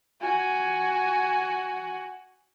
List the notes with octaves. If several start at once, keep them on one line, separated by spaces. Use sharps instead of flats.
F#4 G#5